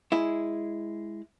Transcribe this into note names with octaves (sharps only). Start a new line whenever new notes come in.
G#3 E4